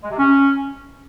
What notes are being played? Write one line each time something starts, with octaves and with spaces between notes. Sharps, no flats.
G#3
C3
C#4